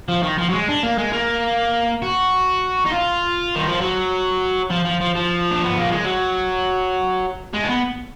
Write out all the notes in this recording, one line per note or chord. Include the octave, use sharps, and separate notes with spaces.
F3
D#3
F3
F#3
G#3
D4
A#3
G#3
A#3
F#4
D#4
F4
D#3
F3
F#3
F3
F3
F3
F3
D4
B3
A#3
G#3
F#3
G#3
D4
B3